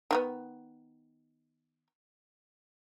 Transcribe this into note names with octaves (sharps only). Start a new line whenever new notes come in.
D#3 F3 B3